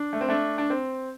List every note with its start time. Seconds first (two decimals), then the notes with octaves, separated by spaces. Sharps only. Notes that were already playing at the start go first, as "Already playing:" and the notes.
Already playing: D4
0.13 A3
0.21 C4
0.29 A3 D4
0.58 D4
0.70 C4